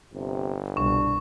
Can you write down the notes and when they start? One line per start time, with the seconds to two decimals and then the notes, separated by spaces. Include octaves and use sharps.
0.14 G1 C3
0.77 C2 G2 B2 D4 C#6